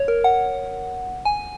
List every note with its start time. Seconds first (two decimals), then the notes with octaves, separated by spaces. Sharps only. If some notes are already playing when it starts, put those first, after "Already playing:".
Already playing: C#5
0.08 A#4
0.24 F#5
1.25 G#5